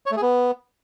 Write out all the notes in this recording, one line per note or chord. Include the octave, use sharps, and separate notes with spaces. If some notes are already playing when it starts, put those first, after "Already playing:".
C#5
A3
G#4
B3